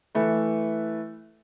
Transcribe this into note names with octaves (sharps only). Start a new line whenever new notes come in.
E3 A3 B4